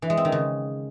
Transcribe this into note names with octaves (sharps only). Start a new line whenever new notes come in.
E3
G#3
C4
D#3
C#3